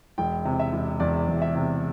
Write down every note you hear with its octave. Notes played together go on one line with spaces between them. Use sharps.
E1 G5
C3
E5
E1
E2 D5
E1
E5
C3